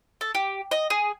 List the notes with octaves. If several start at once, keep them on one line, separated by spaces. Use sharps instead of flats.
A4
G4
D#5
G#4